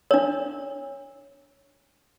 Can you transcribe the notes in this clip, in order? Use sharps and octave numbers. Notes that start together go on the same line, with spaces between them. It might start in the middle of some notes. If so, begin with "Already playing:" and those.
D4 C#5